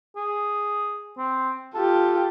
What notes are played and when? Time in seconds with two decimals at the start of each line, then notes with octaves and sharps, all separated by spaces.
0.16 G#4
1.18 C4
1.75 F4 G4 A4